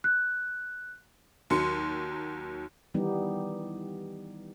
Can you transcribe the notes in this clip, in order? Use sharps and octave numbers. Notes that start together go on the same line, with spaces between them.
F#6
D#2 F#3 C6 C#7
D#3 E3 G3 B3 D#4 G4